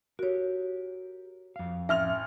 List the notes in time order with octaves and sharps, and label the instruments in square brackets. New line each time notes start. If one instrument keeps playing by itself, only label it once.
[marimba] F#4 C#5 [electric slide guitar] G4 A#4
[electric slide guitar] F2 F5
[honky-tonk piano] A1 F6 F7 [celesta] E5